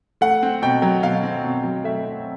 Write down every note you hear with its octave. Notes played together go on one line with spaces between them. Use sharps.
A3 F#5
C4
B2 G5
F#3
B2 F5
C4
B2
F#3
A3 E5
C4